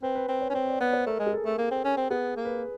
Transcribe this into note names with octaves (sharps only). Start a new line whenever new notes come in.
C4 B4
B4
C4
C#5
C#4
C4 C#5
D5
B3 C#5
C5
A3 A#4
G#3
G#4
A4
A3
A#3
C4
C#4
C4
B3 G#4
A#3
B4